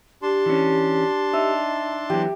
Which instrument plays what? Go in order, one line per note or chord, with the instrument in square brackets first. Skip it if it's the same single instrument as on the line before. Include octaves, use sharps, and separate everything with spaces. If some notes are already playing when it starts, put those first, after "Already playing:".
[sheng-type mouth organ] D4 A5 C6 [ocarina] G4
[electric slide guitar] E3 C#4
[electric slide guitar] D#4 [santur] E5
[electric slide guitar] E3 F#3 B3 [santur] G4